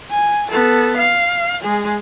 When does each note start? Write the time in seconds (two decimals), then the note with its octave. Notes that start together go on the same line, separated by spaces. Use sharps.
0.11 G#5
0.51 B3 A4
0.97 F5
1.63 G#3 G#4